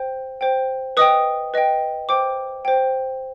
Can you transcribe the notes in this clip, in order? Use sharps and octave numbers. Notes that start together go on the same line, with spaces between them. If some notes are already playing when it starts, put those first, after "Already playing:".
Already playing: C5 G5
C5 G5
B4 D#5 G5 D#6
B4 D#5 G5
C5 G5 D6
C5 G5